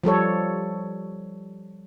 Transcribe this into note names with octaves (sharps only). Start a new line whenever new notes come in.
F3 G3 A4 C#5